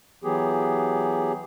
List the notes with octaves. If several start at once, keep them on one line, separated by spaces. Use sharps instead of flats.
E3 F#3 B3 G4 G#4